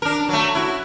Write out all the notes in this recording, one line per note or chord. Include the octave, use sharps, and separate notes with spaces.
D4 A#4
F#3 A3
E4 F#4